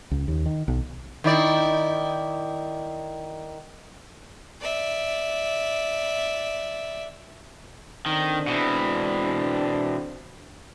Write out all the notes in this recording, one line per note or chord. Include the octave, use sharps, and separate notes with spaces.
C#2
D#2
D#3
B1
D#3 E4 D5
D5 E5
D3 D#3 C4 D4
B2 E3